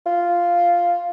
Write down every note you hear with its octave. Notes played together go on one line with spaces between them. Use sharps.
F4